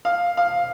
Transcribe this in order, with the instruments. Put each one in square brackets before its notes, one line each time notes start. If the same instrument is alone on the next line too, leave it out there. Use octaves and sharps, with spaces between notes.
[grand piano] F5
F5